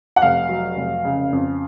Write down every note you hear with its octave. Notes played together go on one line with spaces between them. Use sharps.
F#5
F1 F5
F#3
F1
C#3
F2